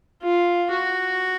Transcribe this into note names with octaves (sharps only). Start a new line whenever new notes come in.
F4
F#4